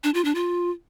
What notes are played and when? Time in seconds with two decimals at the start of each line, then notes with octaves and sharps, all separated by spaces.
0.04 D4
0.14 F4
0.24 D4
0.35 F4